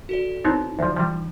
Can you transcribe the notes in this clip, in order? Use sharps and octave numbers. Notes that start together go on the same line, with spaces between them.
F#4 A4 D5
B3 C4 D#4 E4 C#5
D2 F3
E3 F3 G3